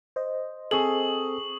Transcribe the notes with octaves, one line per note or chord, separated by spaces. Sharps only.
C5 D#5
C4 G#4 A4 C#6 D#6 F#7